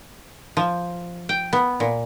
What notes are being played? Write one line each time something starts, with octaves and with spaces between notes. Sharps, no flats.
F3
G5
B3
A#2